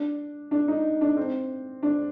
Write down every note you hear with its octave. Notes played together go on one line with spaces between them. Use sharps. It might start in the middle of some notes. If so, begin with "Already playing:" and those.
Already playing: D4
D4
D#4
D4
C4
D4